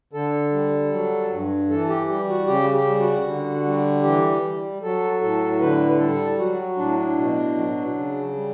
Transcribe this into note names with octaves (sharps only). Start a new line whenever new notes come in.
D3 A4
G3
F#3
G2
E3 A4
G4
G3 G4
F#4
C#3 G4
G4
G3
F#4
D3
G3
E3 G4
G3
F#3 A4
A2 A4
D3 B4
G3 A4
F#3 F#4
A2 D4
D4
B2
F#3
C#3
G3